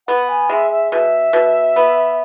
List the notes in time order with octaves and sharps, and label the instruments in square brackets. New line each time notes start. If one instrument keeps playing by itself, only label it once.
[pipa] B3 [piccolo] F#5
[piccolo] G#5
[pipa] G#3 [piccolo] E5
[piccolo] E5
[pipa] B2 [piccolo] E5
[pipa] B2
B3